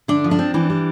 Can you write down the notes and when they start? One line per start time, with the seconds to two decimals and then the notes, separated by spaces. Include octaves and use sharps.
0.08 D3 D4
0.24 F3
0.31 D4
0.39 C4
0.54 E3 D4
0.70 G3